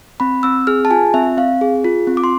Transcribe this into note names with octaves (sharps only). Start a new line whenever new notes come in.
C4 B5
C4 E6
G#4 F6
A5
F4 G#5
C4 E5
C4 F5
G#4
F4
C4
D6
C6